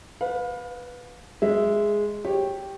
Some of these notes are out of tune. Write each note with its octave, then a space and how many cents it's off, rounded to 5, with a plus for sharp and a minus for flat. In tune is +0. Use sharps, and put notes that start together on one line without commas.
B4 +0 F5 +30
G#3 +0 E5 +0
G4 +0 C#5 -20